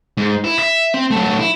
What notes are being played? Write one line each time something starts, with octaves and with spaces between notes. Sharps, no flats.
G#2
E4
E5
C4
F#3 A3
E4